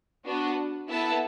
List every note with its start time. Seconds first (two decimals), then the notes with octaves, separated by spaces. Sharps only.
0.25 B3 D4 F#4
0.89 B3 E4 A4 E5 A5